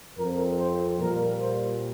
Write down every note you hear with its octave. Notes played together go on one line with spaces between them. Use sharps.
F2 F3 C4 A#4
C5
A#2 G3 A#3 A#4
C5